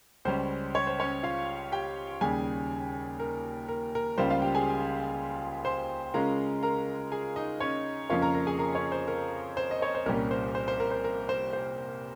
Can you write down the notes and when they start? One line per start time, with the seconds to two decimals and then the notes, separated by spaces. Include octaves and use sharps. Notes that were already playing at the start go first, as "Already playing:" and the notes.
0.25 C#2 C#3 G3 C#4 C5
0.75 C#5
0.87 C5
1.00 C#4 C#5
1.23 F4 F5
1.72 G4 G5
2.21 D#2 C#3 G3 G#4 G#5
3.20 A#4
3.68 A#4
3.95 A#4
4.18 C#2 C#3 G3 A#3 F4 C5
4.30 F4 F5
4.42 G4 G5
4.55 G#4 G#5
5.65 C5 C6
6.14 C#3 G#3 C#4 F4 A#4 A#5
6.63 A#4 A#5
7.12 G#4 G#5
7.36 D#4 D#5
7.60 C#4 C#5
8.10 F2 C#3 F3 A#3 C#4 F4 C#5
8.22 A#4 A#5
8.34 A#4 A#5
8.47 G#4 G#5
8.59 A#4 A#5
8.75 C#4 C#5
8.92 C5
9.08 A#4
9.57 C5
9.71 D#5
9.82 C#5
9.95 C5
10.06 C2 A#2 G3 C#4 A#4
10.31 C5
10.55 C5
10.68 C5
10.80 A#4
10.91 C5
11.04 A#4
11.29 C5
11.53 C5